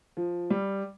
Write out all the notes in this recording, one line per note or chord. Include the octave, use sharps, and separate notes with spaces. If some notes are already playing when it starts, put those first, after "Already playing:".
F3
G3